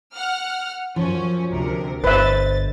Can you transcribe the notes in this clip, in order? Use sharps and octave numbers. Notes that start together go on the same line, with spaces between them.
F#5 F6
F#2 F3 C#4
D2 C3 A#4
G1 B4 C5 D#5 E5 A6